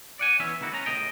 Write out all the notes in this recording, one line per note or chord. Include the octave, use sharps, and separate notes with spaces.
D5 F#5 G#5
E3 B3 C#4 C#5 E5
C#2 D#3 A#3 E4 F#4
B3 C#4 A#5
C#2 A2 G#3 C4 D#5 G5